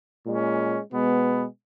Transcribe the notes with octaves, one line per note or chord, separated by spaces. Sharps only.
A#2 G#3 C#4
B2 G#3 B3